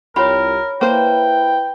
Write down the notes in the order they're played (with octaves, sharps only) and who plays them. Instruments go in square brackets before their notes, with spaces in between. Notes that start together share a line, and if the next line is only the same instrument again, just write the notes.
[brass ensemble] C2 [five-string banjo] F4 G4 [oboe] A#4 [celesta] C#5 B5
[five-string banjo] A#3 C5 [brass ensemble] E4 B4 [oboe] G5